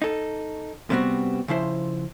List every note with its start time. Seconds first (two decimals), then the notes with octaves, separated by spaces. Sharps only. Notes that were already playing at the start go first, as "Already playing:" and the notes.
0.02 D#4 A4
0.90 C3 G3 B3 C4 F#4
1.48 C#3 F3 E4 C5